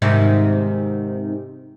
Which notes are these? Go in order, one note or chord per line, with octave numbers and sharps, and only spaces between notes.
G#2 C3 D#3